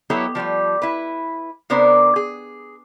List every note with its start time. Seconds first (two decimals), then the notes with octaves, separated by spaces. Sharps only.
0.10 F#3 B3 E4 G4 A4 C#5
0.35 F3 G3 A3 G4
0.82 E4 B4
1.70 C3 B3 D4 A#4 C5 D5
2.16 G#4